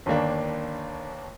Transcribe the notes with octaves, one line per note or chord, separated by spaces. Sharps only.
G1 D#2 A#3 D4